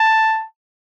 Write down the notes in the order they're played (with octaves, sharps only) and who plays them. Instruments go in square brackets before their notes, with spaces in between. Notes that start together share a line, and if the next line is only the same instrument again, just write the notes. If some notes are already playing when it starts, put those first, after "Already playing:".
Already playing: [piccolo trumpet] A5